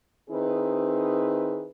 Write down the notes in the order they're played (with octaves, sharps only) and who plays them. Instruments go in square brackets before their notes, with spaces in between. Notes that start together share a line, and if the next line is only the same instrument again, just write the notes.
[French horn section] D#3 C4 D#4 E4 G#4 B4